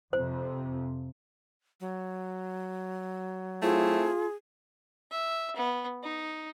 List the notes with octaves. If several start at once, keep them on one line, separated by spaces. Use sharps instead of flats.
F2 C3 C5
F#3
A3 C4 E4 F4 G#4
E5
B3
D#4